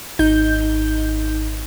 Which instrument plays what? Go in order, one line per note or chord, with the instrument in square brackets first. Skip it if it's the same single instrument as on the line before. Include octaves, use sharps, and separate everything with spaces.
[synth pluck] G#1 D#4 G6